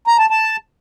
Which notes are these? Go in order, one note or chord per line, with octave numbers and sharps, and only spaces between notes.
A#5
A5
A5